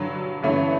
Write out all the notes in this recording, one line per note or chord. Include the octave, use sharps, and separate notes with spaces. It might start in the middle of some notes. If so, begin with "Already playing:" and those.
Already playing: G2 D3 F#3
G1 G2 E3 A3 C#4